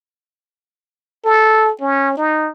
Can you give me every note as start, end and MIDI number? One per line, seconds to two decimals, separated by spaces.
1.25 1.71 69
1.81 2.17 61
2.17 2.50 63